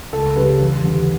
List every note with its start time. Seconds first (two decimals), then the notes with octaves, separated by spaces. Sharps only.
0.13 C#2 A4
0.36 C#3 G3 B4
0.61 E2
0.84 D3 G3